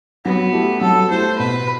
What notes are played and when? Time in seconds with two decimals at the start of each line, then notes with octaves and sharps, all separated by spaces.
0.25 F#3 B3
0.53 A3 E4 G4
0.81 F#3 A4
1.10 A3 E4 G4 C5
1.38 B2 B4